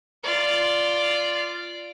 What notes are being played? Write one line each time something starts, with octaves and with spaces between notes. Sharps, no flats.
F4 D5